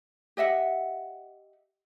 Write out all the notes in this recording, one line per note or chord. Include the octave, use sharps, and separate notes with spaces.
G4 D#5 E5 F#5